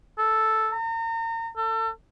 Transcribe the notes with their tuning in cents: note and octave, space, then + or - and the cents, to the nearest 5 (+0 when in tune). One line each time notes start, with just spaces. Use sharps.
A4 +0
A#5 -35
A4 +30